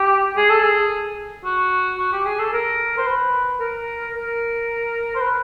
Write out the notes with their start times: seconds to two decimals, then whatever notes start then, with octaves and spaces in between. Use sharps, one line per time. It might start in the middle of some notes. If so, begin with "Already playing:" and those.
Already playing: G4
0.37 G#4
0.50 A4
0.63 G#4
1.44 F#4
1.98 F#4
2.12 G4
2.26 G#4
2.39 A4
2.53 A#4
2.97 C5
3.06 B4
3.60 A#4
4.14 A#4
5.15 C5
5.21 B4